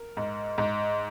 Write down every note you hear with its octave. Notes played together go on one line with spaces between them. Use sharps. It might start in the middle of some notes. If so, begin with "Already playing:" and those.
Already playing: A#4
G#2
G#2